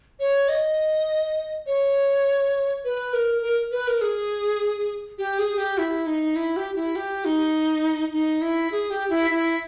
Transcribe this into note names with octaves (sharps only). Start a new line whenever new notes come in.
C#5
D#5
C#5
B4
A#4
A#4
B4
A#4
G#4
G4
G#4
G4
E4
D#4
E4
G4
E4
G4
D#4
D#4
E4
G#4
G4
E4
E4